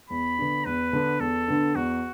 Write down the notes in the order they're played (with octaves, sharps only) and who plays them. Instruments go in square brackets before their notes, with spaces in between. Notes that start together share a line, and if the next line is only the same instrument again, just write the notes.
[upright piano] E2 [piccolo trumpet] B5
[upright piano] D3 B3 D4
[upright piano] E2 [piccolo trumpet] B4
[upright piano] D3 B3 D4
[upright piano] E2 [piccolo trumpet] A4
[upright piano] D3 B3 D4
[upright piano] E2 [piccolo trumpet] F#4